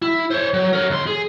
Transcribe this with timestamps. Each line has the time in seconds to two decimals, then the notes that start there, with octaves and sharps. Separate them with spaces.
0.02 E4
0.31 C5 C#5
0.54 F#3
0.73 A#4 C#5
0.90 D#2 C6
1.07 G#4